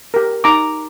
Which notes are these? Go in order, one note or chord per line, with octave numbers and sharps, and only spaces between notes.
G4 A#4
D#4 A#5 D6